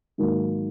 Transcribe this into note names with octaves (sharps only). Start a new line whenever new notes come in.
G#2 D#3 F#3 A#3